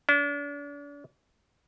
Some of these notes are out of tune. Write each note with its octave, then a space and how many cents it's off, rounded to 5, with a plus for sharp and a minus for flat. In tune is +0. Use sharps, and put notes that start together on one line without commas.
D4 -40